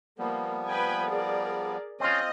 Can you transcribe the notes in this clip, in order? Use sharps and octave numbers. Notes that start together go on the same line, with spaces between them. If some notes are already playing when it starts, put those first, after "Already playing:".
F3 G3 A#3 B3
B4 G5 G#5
G#4 A#4 D5
C4 C#4 F4 D#5